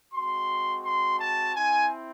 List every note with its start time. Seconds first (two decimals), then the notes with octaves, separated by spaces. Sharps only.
0.14 G#3 C4 F#4 C6
0.84 C6
1.19 A5
1.54 C4 E4 G#5